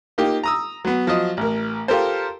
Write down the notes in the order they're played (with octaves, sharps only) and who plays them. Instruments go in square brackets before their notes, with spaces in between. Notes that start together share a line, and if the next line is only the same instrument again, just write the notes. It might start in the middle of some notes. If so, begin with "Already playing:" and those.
[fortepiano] A#3 D#4 F4 G4
A#5 D#6 E6
F#3 B3
F3 F#3 D#5
A1 A#4
F4 G4 A4 A#4 C5